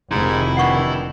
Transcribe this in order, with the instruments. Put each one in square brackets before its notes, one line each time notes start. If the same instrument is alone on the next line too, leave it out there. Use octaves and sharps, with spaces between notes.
[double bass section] F1 D#3 [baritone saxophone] G#2 [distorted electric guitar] E4
[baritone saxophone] G2 [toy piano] F#5 C#6